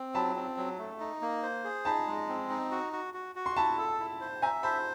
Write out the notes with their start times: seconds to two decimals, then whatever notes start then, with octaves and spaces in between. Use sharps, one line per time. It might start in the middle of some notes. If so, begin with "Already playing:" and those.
Already playing: C4
0.14 F#3 A5 B5
0.36 C4
0.57 F#3
0.79 A3
1.00 D#4
1.22 A#3
1.43 C5
1.64 G#4
1.85 D#4 A5 B5
2.07 G#3
2.29 C4
2.50 D#4
2.71 F#4
2.93 F#4
3.14 F#4
3.35 F#4
3.46 C6
3.57 E4 A5 B5
3.78 A4
4.00 E4
4.21 C5
4.42 E5 G#5 A#5
4.63 C5 A5 B5